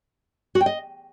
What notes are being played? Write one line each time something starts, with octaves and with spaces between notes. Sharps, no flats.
F#4
G5
D#5